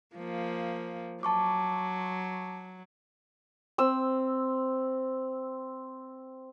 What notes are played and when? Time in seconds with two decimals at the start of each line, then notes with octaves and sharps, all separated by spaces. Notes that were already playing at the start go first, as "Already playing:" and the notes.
0.16 F3 A#3
1.23 F#3 A5 C#6 D6
3.78 C4 E6